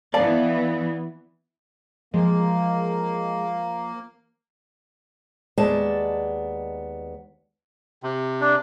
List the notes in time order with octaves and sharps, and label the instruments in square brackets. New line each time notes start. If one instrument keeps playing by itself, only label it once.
[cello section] E3 B3 [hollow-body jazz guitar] D5 F5 A5
[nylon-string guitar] F3 [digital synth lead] G#3 [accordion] A#3
[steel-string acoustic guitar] D#2 G#3 B3 D5 A5
[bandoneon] C3
[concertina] D4